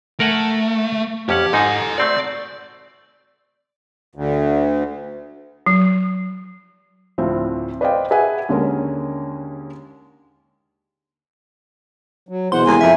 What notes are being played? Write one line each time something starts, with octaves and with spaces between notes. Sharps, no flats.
A3 A#4 F#5 G#5
F2 C#4 G4 F#5
G#2 D#4 A4 G#5
A3 C4 F#4 D5
D2
F#3
D2 A2 F3 C4
B4 C5 D5 D#5 F5 G5
G#4 B4 E5 F#5 G#5
D#2 D3 G#3 C#4 A#4
F#3
E2 B2 C5 F#5 C6
D#2 C3 G#3 G#5
F2 E5